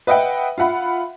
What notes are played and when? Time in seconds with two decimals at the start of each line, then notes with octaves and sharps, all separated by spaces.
0.07 B4 D#5 E5 F#5 G5
0.58 F4 E5 F#5 B5